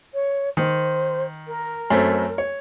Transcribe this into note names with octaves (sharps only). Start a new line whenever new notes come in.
C#5
D#3 C5
A#4
F#2 A3 C4
C#5